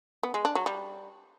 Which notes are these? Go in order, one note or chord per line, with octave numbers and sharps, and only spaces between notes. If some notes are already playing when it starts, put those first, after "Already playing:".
B3
G#3
D4
F#3
G3